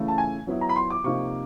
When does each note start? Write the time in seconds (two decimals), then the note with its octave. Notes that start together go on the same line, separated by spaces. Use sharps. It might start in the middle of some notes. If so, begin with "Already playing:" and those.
Already playing: C#3 E3 A3
0.08 A5
0.18 G#5
0.47 F#3 B3 E4
0.61 A#5
0.69 B5
0.76 C6
0.90 D6
1.04 C3 F3 A#3 D#4 C#6